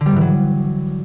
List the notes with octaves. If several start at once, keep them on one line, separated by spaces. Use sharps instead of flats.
D3
G3
G#2
E3
F#3